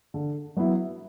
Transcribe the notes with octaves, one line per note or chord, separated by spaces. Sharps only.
D3
F#3 B3 E4